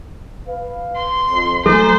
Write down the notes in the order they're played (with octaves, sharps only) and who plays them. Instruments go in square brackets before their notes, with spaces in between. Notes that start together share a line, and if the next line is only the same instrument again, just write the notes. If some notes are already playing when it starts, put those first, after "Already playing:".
[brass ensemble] B4 F5
[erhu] C6
[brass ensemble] F2
[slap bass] F#3 A3 [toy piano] A4 [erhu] C5 [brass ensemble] G#5 A#5